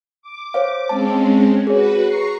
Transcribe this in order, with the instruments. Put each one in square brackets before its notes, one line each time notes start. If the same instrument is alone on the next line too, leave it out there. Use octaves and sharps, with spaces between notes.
[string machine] D6
[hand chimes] C5 C#5 F5
[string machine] G#3 C4 C#4 [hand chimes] A5
[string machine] F#4 B4 [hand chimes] G#4 C#5
[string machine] A#5 C#6 C7